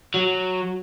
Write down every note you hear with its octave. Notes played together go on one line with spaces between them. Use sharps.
F#3